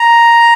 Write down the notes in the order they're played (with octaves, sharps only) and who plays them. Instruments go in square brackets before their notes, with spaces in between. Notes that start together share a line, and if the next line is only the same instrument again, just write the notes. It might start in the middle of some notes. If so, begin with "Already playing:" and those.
Already playing: [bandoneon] A#5